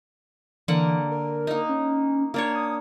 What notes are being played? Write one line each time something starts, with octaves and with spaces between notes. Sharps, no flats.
D3 E3 A#3 F#5
A#4
A#3 D#4
C#4
A#3 D4 C#5
D#6